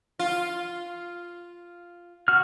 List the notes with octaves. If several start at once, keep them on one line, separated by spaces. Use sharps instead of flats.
F4
F#4 F6